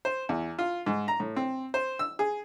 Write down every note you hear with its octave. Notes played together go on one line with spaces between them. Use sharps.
C5
E2
F4
G#2
A#5
A2
C4
C5
E6
G#4